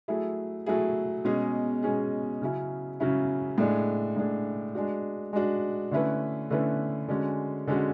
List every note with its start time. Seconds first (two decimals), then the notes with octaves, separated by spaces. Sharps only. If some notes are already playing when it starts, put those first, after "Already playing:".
0.08 F#3 A3 E4 G#4
0.66 F#3 A3 E4 G#4
1.25 B2 G#3 C#4 G#4
1.83 B2 G#3 C#4 G#4
2.42 C#3 F#3 C#4 E4
3.00 C#3 F#3 C#4 E4
3.58 A2 G#3 D4 G#4
4.16 A2 G#3 D4 G#4
4.75 G#3 D4 F#4
5.33 G#3 D4 F#4
5.91 D3 A3 C#4 E4 B4
6.50 D3 A3 C#4 E4 B4
7.08 D3 G#3 C#4 F#4
7.67 D3 G#3 C#4 F#4